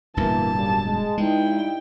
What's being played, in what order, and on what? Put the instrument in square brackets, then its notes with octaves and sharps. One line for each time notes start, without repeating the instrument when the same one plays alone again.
[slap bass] D1 G2 B2 [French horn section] E3 A#3 [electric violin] A5
[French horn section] A#2 C#3 G3
G#3
[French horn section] G2 D#4 [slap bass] G#3 [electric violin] E4 G5